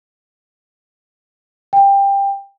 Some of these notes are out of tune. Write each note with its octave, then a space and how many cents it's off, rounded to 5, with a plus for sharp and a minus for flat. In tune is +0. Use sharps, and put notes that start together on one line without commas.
G5 +20